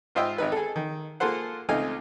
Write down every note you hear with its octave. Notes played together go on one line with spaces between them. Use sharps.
G#2 F4 C5 D#5 E5 G5
G#1 D#4 B4
G#4 A4
D#3
A#3 F4 G#4 A4 C5 F#5
C#2 A3 C4 D#4 F5 G#5